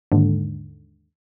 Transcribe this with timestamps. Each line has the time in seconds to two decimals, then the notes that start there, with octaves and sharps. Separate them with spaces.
0.12 D#2 G#2 D3